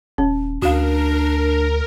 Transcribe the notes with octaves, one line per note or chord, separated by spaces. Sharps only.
D#1 C#4
D2 D4 F#4 A#4 F5